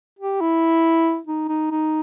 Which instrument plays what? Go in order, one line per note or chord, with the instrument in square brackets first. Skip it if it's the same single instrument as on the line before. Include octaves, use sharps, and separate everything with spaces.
[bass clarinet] G4
E4
D#4
D#4
D#4